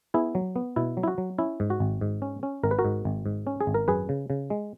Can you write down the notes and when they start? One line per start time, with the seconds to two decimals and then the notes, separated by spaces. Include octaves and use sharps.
0.14 B3 E4 G#4
0.35 F#3
0.56 B3
0.76 B2 E4
0.97 F#3
1.03 E4
1.08 F#4
1.18 F#3
1.38 C#4 E4
1.60 G#2
1.70 F#4
1.80 G#1
2.01 G#2
2.22 C#4
2.43 C#4
2.63 G#1 A#4
2.71 B4
2.79 F#4 A#4
2.85 G#2
3.05 G#1
3.26 G#2
3.47 C#4
3.61 G#4
3.67 G#1
3.74 A#4
3.88 F#2 G#4 B4
4.09 C#3
4.30 C#3
4.50 G#3